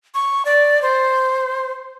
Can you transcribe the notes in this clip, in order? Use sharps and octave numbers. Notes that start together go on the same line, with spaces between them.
C#6
D5
C5